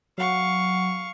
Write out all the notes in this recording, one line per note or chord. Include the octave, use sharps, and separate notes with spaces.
F#3 F5 F#5 C#6